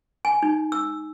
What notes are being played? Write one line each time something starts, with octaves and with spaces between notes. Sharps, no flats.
G#5
D#4
E6